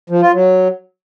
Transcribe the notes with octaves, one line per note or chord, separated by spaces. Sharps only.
F3
F4
F#3